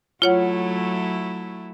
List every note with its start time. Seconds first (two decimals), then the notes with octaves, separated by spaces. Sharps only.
0.22 F#3 A3 E4 F4 C#5 F#5